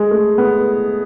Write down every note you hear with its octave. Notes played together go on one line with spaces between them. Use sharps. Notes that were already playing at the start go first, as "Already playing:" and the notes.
Already playing: G#3
A3
B3